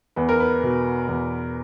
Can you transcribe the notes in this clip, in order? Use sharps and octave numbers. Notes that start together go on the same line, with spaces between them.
E2 B4
A#4
B4
B2
E2